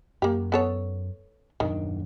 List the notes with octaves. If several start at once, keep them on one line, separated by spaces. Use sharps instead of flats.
F#2 A#3 G4
B3 A4 C#5
D#1 F#2 D#3 D4